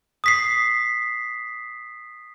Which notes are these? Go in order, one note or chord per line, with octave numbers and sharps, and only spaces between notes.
D#6 B6 C7